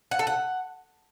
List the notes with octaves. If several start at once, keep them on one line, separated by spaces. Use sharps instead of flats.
F#5
A4
F#5